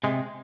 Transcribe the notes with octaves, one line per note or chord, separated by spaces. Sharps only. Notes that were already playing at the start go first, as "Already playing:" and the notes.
C3 G#3